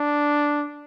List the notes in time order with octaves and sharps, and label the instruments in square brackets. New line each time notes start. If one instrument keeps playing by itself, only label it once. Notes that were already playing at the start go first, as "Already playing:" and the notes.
Already playing: [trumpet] D4